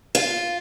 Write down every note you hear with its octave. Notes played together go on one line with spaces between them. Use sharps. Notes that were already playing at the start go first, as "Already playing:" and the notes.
F4